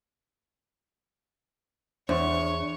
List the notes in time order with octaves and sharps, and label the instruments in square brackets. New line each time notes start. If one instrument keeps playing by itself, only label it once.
[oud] E2 [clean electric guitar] D4 [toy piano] C5 C6 [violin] C#5